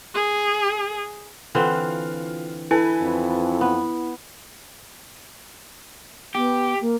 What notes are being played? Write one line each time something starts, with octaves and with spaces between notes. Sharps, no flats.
G#4
D3 E3 C4 F4
E4 A4 B4 G#5
F2
B3
B3 G4
A#3